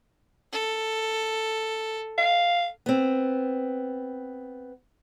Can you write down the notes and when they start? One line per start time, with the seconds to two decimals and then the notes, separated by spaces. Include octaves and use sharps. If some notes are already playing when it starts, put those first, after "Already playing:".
0.52 A4
2.18 F5
2.86 B3 C4